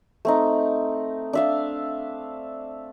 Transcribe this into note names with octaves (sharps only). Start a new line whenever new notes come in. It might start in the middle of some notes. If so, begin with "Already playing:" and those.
A3 C4 D#4
D4 E5 F5